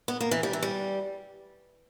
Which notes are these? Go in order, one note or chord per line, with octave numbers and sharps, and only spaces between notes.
B3
A#3
E3
G3
E3
G3